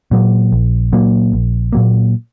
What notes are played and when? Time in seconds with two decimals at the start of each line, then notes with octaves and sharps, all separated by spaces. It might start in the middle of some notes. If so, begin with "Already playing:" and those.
0.11 A#2 F#3 A#3
0.52 A#1
0.93 A#2 F#3 A#3
1.33 A#1
1.73 A#2 F#3 A#3